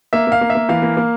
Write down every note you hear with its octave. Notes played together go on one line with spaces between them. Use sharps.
A#3 E5
A#3 F5
A#3
E5
A#3
E3 F5
A#3
A#3